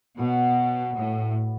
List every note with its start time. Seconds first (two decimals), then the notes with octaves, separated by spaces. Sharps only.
0.18 B2 F#3 B3 F#4 B4
0.96 A2